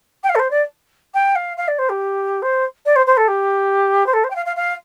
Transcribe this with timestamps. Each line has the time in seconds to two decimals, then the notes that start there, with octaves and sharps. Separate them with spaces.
0.23 G5
0.29 F5
0.35 A4
0.39 C5
0.50 D5
1.14 G5
1.35 F5
1.57 F5
1.67 D5
1.78 C5
1.89 G4
2.42 C5
2.85 D5
2.95 C5
3.06 C5
3.16 A4
3.27 G4
4.06 C5
4.13 A4
4.23 C5
4.30 G5
4.35 F5
4.45 F5
4.56 F5